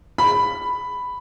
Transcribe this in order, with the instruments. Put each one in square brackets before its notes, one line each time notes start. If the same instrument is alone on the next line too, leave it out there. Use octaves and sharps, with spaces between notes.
[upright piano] B5